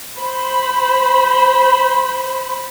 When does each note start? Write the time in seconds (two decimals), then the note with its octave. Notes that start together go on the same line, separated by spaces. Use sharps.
0.17 C5 B5